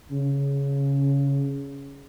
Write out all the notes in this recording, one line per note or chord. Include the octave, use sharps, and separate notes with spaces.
C#3